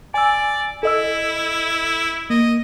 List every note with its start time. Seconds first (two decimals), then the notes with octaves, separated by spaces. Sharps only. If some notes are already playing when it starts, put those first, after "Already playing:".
0.14 D5 G#5 E6
0.83 E4 A4 D#5 E6
2.30 A#3 D#5